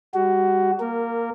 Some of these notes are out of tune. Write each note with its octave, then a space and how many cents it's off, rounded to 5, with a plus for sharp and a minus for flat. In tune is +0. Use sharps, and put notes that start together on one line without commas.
G3 +35 F#4 +15
A#3 +0 A#4 -15